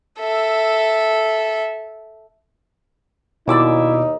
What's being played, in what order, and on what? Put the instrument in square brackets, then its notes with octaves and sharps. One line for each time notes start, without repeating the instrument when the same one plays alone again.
[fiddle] A4 E5
[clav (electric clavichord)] D#2 D5 [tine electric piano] B2 D6 E6 [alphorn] D#4 [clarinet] E4